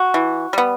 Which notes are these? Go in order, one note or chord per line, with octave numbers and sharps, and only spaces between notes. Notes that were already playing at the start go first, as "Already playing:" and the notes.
Already playing: F#4
E3
G3 B3